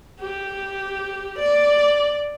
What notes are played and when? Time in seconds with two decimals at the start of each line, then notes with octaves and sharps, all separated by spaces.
0.20 G4
1.39 D5